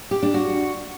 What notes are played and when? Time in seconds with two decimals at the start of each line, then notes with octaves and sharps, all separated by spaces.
0.11 G4
0.23 D4
0.34 F#4